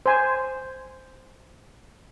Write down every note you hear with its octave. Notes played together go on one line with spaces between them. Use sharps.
C5 G#5